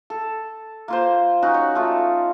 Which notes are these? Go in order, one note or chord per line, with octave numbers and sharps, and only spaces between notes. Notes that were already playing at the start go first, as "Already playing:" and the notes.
A4
A#3 F4 C5
C#4 D#4 F#4
C#5
A3 D#4 F4